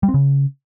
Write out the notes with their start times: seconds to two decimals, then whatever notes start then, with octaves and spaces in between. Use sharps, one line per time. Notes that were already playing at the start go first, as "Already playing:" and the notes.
0.03 G3
0.09 C4
0.14 C#3